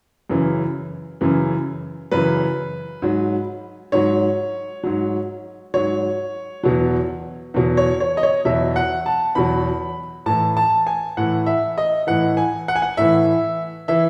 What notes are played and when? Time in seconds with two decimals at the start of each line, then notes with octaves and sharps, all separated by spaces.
0.30 F#2 C#3 E3
1.21 F#2 C#3 E3
2.11 F#2 C#3 E3 B4
3.02 G#2 F#3
3.92 G#2 F#3 C#5
4.84 G#2 F#3
5.74 G#2 F#3 C#5
6.63 E2 B2 F#3
7.54 E2 B2 F#3
7.77 C#5
8.00 C#5
8.17 D#5
8.23 C#5
8.45 E2 B2 F#3 E5
8.76 F#5
9.06 A5
9.35 E2 B2 F#3 B5
10.26 A2 E3 A5
10.57 A5
10.87 G#5
11.17 A2 E3 F#5
11.46 E5
11.78 D#5
12.07 A2 E3 F#5
12.37 G#5
12.68 F#5
12.76 G#5
12.82 F#5
12.97 A2 E3 E5
13.88 E3 E5